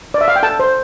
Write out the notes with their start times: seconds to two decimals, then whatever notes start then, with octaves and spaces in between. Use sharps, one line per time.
0.14 D5
0.21 E5
0.28 F5
0.36 G5
0.43 A4 A5
0.60 C5